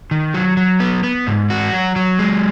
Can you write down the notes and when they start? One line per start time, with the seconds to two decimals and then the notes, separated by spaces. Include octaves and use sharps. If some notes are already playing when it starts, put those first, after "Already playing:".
0.11 D#3
0.34 F#3
0.57 F#3
0.80 B3
1.03 B3
1.27 G#2
1.50 F#4
1.73 F#3
1.96 F#3
2.19 G#3